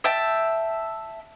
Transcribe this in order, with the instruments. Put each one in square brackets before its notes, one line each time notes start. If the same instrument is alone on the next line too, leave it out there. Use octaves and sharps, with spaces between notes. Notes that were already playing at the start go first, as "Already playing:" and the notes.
[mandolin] E5 G5 A5